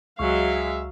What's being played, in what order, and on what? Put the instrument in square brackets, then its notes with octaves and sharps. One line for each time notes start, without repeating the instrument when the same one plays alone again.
[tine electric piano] C#2 C#6 [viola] F#3 F5 [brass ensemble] G#3 E5